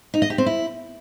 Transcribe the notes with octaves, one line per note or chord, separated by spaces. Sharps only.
D#4
D#5
G4
C4
E4